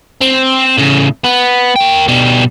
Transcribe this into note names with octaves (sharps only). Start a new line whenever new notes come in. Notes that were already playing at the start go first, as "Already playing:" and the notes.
C4
A2 C#3
B3
A#3 G5
B2 G3